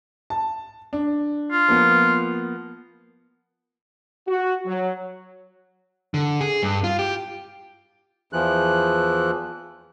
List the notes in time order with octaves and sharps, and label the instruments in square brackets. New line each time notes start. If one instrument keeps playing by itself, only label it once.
[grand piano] A5
D4
[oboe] F4
[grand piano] F3 A#3 B3
[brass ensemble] F#4
F#3
[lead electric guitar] D3
G#4
G2
F4
G4
[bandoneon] E2 E3 F3 F#6